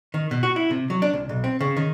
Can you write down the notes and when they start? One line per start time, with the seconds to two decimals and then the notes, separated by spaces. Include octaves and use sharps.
0.14 D#3
0.31 B2
0.43 F#4
0.56 E4
0.71 C3
0.90 F#3
1.02 D4
1.13 C2
1.29 B1
1.44 C4
1.61 C#3
1.77 D#3